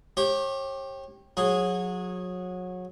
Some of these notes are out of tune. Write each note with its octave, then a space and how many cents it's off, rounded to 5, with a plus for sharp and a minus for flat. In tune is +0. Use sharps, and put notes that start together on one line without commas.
G4 +0 C#5 -40
F#3 -25 G#4 -5